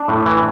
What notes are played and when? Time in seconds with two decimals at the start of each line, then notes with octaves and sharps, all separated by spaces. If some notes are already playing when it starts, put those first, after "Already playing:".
Already playing: D4
0.08 A2
0.26 E3